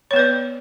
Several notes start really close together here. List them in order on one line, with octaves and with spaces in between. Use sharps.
C#5 B3 B4 D5